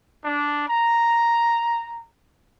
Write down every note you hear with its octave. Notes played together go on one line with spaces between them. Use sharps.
D4
A#5